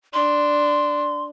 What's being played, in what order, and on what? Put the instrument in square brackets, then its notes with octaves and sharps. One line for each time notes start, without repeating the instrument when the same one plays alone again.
[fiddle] D4 [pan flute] C6